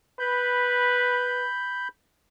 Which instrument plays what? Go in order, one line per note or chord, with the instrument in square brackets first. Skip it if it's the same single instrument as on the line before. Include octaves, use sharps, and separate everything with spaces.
[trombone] B4 [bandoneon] B5 G6